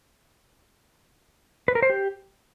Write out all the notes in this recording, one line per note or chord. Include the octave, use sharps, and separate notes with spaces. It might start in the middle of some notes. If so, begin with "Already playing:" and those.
B4
A#4
C5
G4